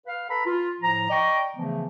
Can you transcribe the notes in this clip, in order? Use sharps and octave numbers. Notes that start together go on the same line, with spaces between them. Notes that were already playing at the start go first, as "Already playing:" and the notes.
B4 F5
A4 B4 A#5 B5
F4
A2 F3 A#5
D5 D#5 G5 A#5 C#6
C#3 E3 F3 A3 B3